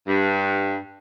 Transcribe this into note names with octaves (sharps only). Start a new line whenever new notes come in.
G2